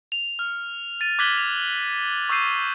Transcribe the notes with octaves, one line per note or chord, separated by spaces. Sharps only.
F7
F6
A6 D#7
D6 F#6 G#6 B6 F#7 G7
F7
C#6 D6 E6 G6 C7 D#7